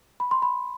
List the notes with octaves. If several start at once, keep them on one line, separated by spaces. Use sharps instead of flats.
B5
C6
B5